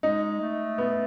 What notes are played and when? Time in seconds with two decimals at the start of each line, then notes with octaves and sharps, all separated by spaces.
0.03 G#3 D#4
0.41 A3
0.78 B3